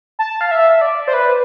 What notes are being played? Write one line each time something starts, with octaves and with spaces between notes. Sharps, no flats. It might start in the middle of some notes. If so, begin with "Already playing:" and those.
A5
F5
E5
D5
C5
B4